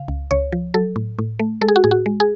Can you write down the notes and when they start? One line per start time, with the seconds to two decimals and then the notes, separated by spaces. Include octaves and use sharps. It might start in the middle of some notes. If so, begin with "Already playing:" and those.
Already playing: C#3 F5
0.08 C#2
0.31 C#2 C#5
0.52 F3
0.74 F#3 A4
0.96 A2
1.19 A2
1.39 A3
1.61 G#3 A4
1.68 G#4
1.76 F#4
1.84 A2 G#4
1.91 F#4
2.06 G#3
2.20 G#4